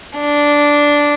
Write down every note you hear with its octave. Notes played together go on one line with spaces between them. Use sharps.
D4